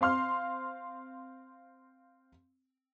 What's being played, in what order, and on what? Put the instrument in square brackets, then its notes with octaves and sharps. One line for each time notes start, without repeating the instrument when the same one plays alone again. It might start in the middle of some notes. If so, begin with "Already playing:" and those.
[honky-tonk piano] C4 F5 C6 F6